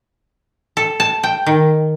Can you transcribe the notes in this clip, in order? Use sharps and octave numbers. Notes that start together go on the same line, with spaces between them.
A4
A5
G5
D#3